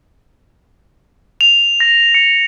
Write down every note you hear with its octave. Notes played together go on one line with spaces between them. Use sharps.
F7
A#6
C#7